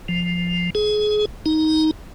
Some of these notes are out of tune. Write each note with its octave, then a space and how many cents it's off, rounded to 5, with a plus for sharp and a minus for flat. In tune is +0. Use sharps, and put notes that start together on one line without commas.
F3 +5
G#4 +25
D#4 +10